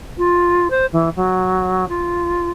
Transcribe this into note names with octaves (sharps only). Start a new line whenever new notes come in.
F4
C5
E3
F#3
F4